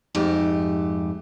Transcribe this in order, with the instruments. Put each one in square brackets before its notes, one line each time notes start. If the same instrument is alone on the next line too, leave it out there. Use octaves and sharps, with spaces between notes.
[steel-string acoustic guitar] F2 G#2 A3 G4